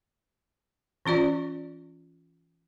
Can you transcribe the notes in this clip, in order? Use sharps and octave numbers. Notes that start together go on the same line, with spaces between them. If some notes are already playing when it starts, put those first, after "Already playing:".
E3 C#4 F4 D5